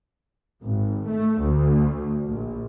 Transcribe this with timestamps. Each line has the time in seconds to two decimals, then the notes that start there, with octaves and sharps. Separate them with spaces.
0.63 G#1
1.07 A3
1.39 D2
2.28 A#1